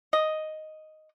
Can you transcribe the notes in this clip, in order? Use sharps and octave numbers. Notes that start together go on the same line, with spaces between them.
D#5